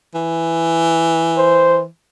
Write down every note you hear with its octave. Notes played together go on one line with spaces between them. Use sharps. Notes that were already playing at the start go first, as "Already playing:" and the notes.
E3
C5